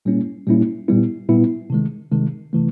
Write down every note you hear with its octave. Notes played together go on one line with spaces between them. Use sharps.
A#2 G3 A#3 C#4 E4
A#2 G3 A#3 C#4 E4
A#2 G3 B3 E4
A#2 G3 B3 E4
C3 D#3 G#3
C3 D#3 G#3
C3 E3 A3